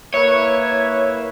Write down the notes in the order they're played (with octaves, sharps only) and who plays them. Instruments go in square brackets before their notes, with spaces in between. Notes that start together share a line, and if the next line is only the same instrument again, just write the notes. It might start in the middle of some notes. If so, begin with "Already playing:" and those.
[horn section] A#3 E4 B4 [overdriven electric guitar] C#5